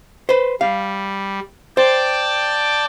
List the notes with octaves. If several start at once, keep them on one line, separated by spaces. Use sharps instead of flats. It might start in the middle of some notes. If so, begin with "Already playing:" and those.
B4 C5
G3 F5
C5 D5 G5 A5